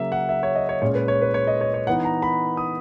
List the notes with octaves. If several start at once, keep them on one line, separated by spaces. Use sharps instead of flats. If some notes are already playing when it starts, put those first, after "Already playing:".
Already playing: C#3 F#3 A#3 E5
F#5
E5
C#5
D#5
C#5
A#2 G#3 C#4 C#5
B4
C#5
B4
C#5
D#5
C#5
C#5
E3 B3 D#4 F#5
A#5
B5
D#6